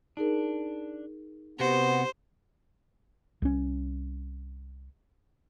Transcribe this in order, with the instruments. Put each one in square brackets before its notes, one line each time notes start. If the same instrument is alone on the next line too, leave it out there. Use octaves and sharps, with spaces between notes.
[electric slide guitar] D4 [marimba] D#4 G#4 A#4
[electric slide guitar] C3 F#4 F#5 [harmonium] B3 [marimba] G4 [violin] C5
[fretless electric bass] C2 C#4